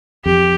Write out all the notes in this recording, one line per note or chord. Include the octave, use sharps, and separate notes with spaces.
F2 G4